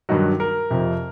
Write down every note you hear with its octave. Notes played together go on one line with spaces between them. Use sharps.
G2 D#3 F#3
A#4
F2 C3 F3